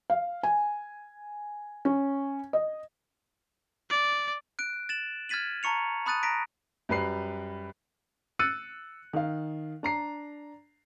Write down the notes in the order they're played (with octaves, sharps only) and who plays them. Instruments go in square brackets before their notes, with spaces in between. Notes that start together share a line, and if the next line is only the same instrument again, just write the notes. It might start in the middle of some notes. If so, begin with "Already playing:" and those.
[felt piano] F5
G#5
C#4
D#5
[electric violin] D5
[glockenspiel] F#6 D7
A6 E7 F#7
F6 G#6 A6 B6 D#7 F#7
A5 A#5 C#6 C#7 F7
A5 B5 D#6 F#6 A6 D#7
A#5 A#6 B6 D7
[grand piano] F#2 G3 B4 C7
[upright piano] E6 F#6 A6 C#7 D#7
D#3 F5
D4 A#5 C7